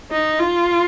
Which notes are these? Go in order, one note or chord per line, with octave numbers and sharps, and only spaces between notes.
D#4
F4